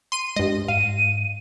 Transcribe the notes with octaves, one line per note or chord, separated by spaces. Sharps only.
C6 D#7
G2 G#3 D#5
G#2 F5 D#7